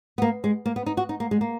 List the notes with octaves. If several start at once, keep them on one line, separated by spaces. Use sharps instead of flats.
B3
A#3
G#3
A#3
B3
D#4
F#4
D#4
A#3
G#3
A#3